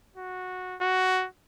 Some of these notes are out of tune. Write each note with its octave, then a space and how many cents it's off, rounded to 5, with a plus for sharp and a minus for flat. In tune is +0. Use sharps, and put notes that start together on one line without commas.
F#4 -10
F#4 +10